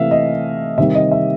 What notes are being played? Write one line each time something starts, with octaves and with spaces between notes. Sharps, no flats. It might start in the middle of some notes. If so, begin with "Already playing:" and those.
Already playing: C3 E3 A3 E5 F5
D#5
C3 D#3 G3 E5
D#5
E5